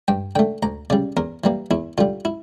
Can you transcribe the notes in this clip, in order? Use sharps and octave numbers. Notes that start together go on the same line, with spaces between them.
G2 G5
D3 A3 G5
D2 A#5
C#3 G3 D5
E2 A#4
E3 G3 A#3
E2 E4
D3 G3 F4
E4